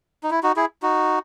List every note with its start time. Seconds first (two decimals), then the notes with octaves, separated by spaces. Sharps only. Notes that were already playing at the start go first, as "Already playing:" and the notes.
0.23 D#4
0.31 E4
0.43 D#4 F#4
0.56 E4 G#4
0.82 D#4 F#4